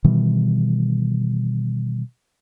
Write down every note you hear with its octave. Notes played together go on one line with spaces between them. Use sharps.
B2 D#3 E3 G3